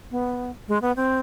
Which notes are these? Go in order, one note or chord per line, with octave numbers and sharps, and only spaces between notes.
B3
G#3
B3
C4